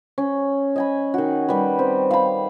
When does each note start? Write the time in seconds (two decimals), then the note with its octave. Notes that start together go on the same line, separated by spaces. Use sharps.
0.18 C#4
0.76 D#5 G#5 B5
1.14 D#3 F#4
1.49 G3 B4
1.79 C4
2.11 F5 B5